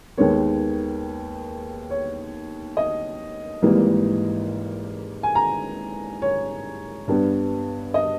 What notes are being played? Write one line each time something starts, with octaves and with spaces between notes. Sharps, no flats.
D#2 D#3 G#3 B3 C#5
C#5
D#5
G#1 G#2 E3 G3 A#3
G#5
A#5
C#5
G2 G3 B3
D#5